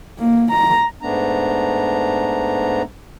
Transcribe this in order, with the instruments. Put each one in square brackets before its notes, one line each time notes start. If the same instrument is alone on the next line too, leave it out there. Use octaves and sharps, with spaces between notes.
[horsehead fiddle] A#3
A#5
[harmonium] G#2 A3 B3 D4 A#5